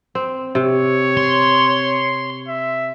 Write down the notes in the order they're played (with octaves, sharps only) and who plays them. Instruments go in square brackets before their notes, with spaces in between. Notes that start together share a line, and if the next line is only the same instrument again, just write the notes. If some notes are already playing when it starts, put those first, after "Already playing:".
[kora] C4
[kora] C3 [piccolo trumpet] C#5
[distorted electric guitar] C6
[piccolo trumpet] E5